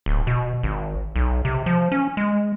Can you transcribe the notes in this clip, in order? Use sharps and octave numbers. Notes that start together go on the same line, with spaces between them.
D1
B2
G#1
B1
C3
F3
C#4
G#3